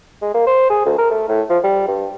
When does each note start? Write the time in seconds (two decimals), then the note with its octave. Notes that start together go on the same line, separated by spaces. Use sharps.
0.22 G#3
0.34 A#3
0.47 C5
0.70 G#4
0.85 D2
0.98 A#4
1.11 A3
1.28 A2
1.49 F3
1.64 G3
1.88 G2